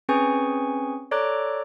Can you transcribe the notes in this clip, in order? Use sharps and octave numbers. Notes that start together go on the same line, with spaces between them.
C4 C#4 G#4 B4 G#5 C#6
A4 C#5 D5 A#5 D6 F#6